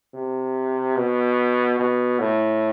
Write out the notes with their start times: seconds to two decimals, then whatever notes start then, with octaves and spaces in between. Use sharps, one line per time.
0.14 C3
0.96 B2
1.79 B2
2.19 A2